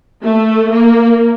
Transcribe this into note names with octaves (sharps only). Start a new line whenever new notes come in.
A3
A#3